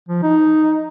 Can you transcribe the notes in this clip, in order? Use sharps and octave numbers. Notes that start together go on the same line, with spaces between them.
F3
D#4